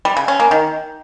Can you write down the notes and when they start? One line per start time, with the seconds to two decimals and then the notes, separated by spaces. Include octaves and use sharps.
0.05 G3
0.17 C#3
0.28 C#4
0.40 A#3
0.51 D#3